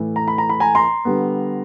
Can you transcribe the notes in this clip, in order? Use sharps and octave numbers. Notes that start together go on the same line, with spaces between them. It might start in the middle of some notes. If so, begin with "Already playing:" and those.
Already playing: A2 E3 A3
A#5
B5
A#5
B5
G#5 A#5
A#5 C6
D3 G3 B3